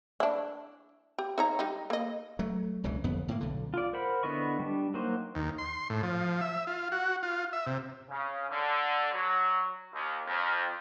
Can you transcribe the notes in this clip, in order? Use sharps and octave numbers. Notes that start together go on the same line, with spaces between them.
D4 E4
G4
D#4 C#5 A#5
G3 D#4 G4
A#3 D#5
F#3 A3
E1 C#2 C#3 E3
G1 F2 B3
A2 A#3
B1 D3
F4 D5
A#4 C5 F#5 B5
D3 B3 E4 D#5 C#6
G3 D4
F#3 A#3 D#4 F#4 C5
D#2
C6
A2
F3
E5
F4
F#4
F4
E5
C3
C#3
D3
F#3
D#2
F2